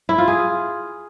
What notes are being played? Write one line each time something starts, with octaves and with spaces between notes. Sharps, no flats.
E4
F4
G#4